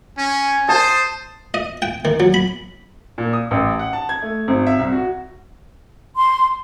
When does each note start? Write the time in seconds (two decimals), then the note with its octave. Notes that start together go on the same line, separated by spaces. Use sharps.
0.18 C#4 G#5
0.69 C5 A5 D#6
1.54 D#5
1.82 G5
2.05 D#3
2.20 F#3
2.34 B5
3.18 A#2
3.33 D#6
3.51 A1
3.79 F#5
3.93 A5
4.09 G#6
4.22 A3
4.48 G#1
4.67 E5
4.79 C2
4.92 F#4
6.17 C6